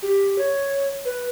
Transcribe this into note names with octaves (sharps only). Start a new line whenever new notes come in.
G4
C#5
B4